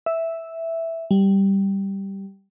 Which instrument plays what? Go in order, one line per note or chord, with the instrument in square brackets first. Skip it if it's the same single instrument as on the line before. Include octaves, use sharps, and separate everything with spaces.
[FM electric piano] E5
G3